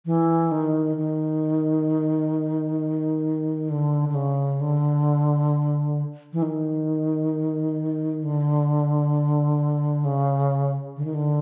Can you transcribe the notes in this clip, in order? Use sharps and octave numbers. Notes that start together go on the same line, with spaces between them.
E3
D#3
D#3
D3
D3
C#3
D3
E3
D#3
D3
C#3
D3
D#3
D3